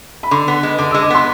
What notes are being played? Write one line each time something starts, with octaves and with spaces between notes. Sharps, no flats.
B5
D3 C6
B3
G#3
D3 D6
G#3 E6
D6
B3 C6